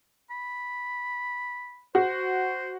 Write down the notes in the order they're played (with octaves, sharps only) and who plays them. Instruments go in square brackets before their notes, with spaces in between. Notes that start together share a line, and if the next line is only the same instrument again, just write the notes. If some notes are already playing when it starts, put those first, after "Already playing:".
[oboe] B5
[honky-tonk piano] F#4 [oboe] C5